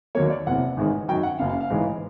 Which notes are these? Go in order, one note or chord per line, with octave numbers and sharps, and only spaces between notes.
D#2 D#3 F#3 A#3 C#5
D5
F#1 E2 C3 F#5
A1 G#2 D#3 G#3
F#2 D#3 F#3 G5
F#5
F#1 F#2 C#3 F5
F5
F5
A1 G#2 E3 G#3